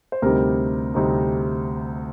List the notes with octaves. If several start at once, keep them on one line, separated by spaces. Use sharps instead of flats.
C5
D2 C3 G3 C4 D#4 A#4
D2 C3 G3 C4 D#4